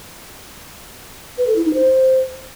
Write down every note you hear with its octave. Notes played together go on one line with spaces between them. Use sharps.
B4
A4
E4
D#4
C5